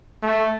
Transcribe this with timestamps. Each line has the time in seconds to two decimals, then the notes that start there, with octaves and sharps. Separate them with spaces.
0.23 A3